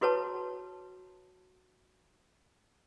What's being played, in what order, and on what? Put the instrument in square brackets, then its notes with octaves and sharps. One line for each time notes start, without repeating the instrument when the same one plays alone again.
[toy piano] E4 F#4 B4 C#5 A5